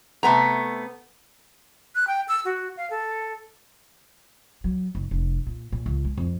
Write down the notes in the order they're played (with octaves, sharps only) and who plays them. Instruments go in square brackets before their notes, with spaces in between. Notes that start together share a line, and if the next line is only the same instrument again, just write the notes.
[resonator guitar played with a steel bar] C3 A3 B3 A#5
[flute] F#6
G5
E6
F#4
F5
A4
[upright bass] F#3
F#1
F1
A#2
A#2
C#2
G#3
F2